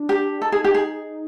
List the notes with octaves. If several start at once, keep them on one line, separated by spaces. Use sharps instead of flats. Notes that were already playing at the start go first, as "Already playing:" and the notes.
Already playing: D4
G4
D#4 A4
G#4
G4
G#4